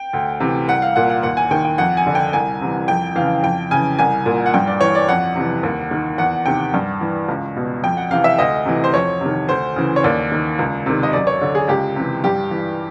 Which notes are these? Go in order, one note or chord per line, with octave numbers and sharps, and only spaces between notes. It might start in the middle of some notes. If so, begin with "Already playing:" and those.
Already playing: G5
D2
C3 E3
C2 F#5
F5
A#2 F#5
F#5
D#2 F#5
G#5
D#3 G5
G5
F2 F#5
G#5
D3
G5
C2 G#5
C3 E3
F2 G5
C#3 E3 F5
F2 G5
C#3 E3 G#5
C2 G#5
A#2
F#5
G2 G5
D5
E3 C#5
D5
F2 F#5
C3 E3
D#2
D#3
E2 F#5
C3 D#3 G5
G2
E3
C#2
B2
F2 G5
F#5
C3 E3 F5
E5
D2 D#5
C3 E3
C5
F2 C#5
C3 D#3
D2 C5
C#3 E3
C#5
D#2 D5
D#3
C#2
C3 D#3
D#5
F#2 D5
C#5
D3
G#4
C#2 G4
C3 E3
G2 G4
E3